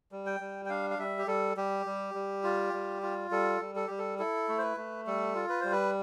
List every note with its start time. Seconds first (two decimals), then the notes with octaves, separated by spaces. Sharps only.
0.12 G3
0.26 G5
0.40 G3
0.65 G5
0.70 D4 F5
0.90 F5
0.99 G3 E5
1.19 G4
1.27 G3 A4
1.57 G3 G4
1.86 G3
2.14 G3
2.44 F4
2.73 G3
3.02 F4
3.31 G3 A4
3.61 G3
3.76 A4
3.87 G3 G4
3.99 A4
4.19 E4 A4
4.49 A3
4.58 C5
4.62 B4
4.77 A3
5.07 G3 A4
5.35 F4
5.49 B4
5.61 G3 C5
5.72 B4